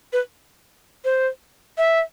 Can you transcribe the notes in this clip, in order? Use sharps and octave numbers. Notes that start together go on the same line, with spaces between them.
B4
C5
E5